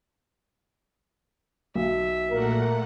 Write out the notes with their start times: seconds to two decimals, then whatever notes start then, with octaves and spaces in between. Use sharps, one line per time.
1.75 B1 E5
2.30 A#2 A3 A#3 A#4 F#5